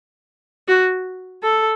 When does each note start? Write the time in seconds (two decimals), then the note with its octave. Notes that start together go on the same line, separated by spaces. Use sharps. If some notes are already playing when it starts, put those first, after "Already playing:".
0.68 F#4
1.43 A4